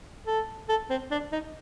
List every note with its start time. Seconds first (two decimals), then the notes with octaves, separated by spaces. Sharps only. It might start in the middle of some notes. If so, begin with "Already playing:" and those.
0.27 A4
0.69 A4
0.90 C4
1.11 D4
1.32 D#4